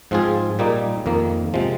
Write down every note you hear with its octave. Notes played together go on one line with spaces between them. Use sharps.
G#2 F3 C4 F4 G#4
A#2 G3 A#3 D#4
F2 D#3 A#3
C3 F3 G#3